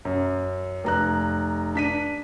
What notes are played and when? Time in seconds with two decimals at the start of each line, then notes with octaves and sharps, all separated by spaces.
0.05 F#2
0.84 F1 A#5 F#6
1.75 D4 B6 D#7